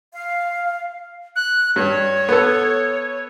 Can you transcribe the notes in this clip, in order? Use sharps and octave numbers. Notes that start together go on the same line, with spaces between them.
F5
F#6
G2 C#5
B3 A4